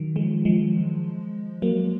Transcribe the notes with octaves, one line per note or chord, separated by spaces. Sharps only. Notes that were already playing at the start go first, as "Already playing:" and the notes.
Already playing: D#3 F#3
F3 G#3
F3 G#3
F#3 A#3